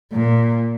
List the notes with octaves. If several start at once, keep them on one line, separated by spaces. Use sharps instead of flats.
A#2